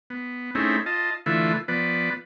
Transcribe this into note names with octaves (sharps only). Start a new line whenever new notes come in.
B3
A3 C4 C#4 D#4 E4 G#4
F4 D#5 A5
D3 E3 A3 E4 F4 B4
F3 B3 B4 D5